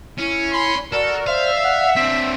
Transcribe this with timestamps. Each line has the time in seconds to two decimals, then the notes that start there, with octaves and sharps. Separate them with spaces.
0.18 C#4 E4
0.53 G#5 B5 C6
0.92 F#4 A4 A#4 D5
1.27 C5 E5 F5
1.64 F#5
1.96 C4 D4 B6